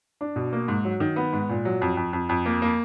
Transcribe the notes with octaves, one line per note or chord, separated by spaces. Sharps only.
D4
B2
A#3
G#2
F#3
D#3
B3
G#2
A#2
F#3
F2
F2
F2
F2
A#3
A#3